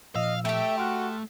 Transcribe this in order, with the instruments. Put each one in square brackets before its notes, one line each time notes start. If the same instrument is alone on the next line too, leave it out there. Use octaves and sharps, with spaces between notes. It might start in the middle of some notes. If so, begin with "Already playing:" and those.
[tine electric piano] A#2 F3 E6 [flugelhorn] D#5 [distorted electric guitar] F5
[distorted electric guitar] A3 [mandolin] G4 G5 [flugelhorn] E5
[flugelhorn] F#4 [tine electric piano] C6 F6 F#6